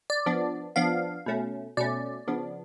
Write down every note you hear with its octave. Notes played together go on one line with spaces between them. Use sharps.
D5
F3 B3 D4
F3 B3 D4 F5
B2 A3 C#4
B2 A3 C#4 D5
C#3 F3 B3 D4